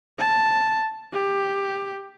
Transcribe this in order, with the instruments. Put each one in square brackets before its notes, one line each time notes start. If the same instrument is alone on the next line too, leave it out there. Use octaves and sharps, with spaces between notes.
[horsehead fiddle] A5
G4